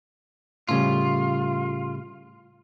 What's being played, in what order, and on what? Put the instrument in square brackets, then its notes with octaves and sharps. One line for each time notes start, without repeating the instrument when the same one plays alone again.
[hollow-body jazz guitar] A2 C#3 G3 [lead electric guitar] F4